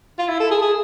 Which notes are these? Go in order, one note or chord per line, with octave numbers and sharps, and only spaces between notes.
F4
E4
A4
G#4
G#4